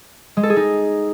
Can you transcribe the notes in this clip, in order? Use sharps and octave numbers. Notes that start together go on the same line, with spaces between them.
G#3
A4
G#4
D#4